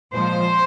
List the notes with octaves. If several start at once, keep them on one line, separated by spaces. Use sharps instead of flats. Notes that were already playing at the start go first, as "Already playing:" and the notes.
A#2 F3 G#3 C5